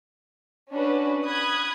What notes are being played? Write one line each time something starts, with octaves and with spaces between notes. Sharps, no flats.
C#4 D4 F#4 B4
B5 D#6 F#6 G#6